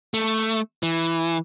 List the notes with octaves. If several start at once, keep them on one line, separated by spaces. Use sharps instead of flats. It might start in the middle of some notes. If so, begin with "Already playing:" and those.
A3
E3